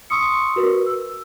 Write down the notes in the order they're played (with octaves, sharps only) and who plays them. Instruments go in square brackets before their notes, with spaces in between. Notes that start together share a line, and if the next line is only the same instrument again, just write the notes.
[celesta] C6 C#6 D#6 E6 C#7
F#4 A#4 B4
E6